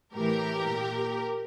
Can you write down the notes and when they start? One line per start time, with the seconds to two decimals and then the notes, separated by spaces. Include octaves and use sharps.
0.14 A2 E3 G4 A#4
0.66 A#2